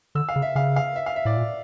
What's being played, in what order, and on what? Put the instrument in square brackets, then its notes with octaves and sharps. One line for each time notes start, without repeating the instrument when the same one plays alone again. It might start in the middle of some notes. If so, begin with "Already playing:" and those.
[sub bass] D3 [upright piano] E6
[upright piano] F5
[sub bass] C#3
[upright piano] E5
[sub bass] C#3 [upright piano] F5
[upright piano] F5
E5
F5
E5
[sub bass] A2 [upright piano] D5
[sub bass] A#2